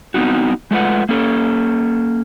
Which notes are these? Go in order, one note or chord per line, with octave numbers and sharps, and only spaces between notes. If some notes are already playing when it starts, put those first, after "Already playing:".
B3 C4 D#4 F#4
G#3 A3 F4 B4 F#5
A#3 C#4 A4